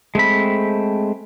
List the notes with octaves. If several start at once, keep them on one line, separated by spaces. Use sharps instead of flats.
G#3 A3 C4 B5